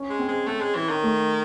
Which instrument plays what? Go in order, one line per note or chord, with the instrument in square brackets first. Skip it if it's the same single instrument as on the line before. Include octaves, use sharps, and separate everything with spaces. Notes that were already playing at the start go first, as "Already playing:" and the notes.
Already playing: [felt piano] C#4
[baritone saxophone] G#3
[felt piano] C4
[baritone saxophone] G#3
[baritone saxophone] A3 [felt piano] C4
[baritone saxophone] G#3
E3
D#3
[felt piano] A3